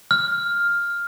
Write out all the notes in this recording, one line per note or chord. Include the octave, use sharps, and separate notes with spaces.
F6